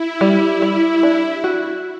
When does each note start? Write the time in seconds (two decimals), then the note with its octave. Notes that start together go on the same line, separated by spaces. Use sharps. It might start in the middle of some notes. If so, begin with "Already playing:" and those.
Already playing: E4
0.21 G3
0.62 G3
1.03 D4
1.44 F#4